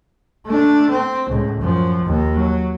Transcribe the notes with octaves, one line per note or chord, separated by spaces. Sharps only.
A3 D4
C4
C#2 A2
F#2 F3
D#2
F#3